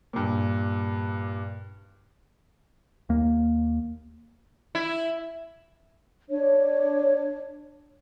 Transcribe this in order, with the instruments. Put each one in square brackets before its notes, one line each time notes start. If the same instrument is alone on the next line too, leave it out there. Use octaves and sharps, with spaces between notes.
[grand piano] G2 A#2
[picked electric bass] D#2 A#3
[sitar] E4
[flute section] D4 C#5